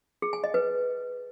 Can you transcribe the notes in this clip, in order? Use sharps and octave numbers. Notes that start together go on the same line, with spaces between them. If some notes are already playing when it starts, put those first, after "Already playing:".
G#4
G#5
D#5
B4